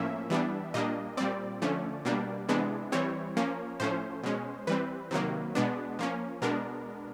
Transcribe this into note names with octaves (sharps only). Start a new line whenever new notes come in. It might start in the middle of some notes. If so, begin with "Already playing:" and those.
Already playing: A2 F3 A#3 C#4 E5
E3 G3 B3 D4
A#2 G3 A#3 D4 D#5
A#2 G3 C4 D5
D3 F3 A3 C#4
B2 G3 A#3 D4
C3 E3 G#3 B3 D4
E3 G3 C4 C#5
F3 A#3 C#4
A2 F3 A3 C#4 C5
B2 G#3 C#4
E3 G3 C4 B4
C3 D#3 F#3 A#3
B2 G#3 B3 D4
F3 A#3 C#4
B2 G#3 B3 D4 A#4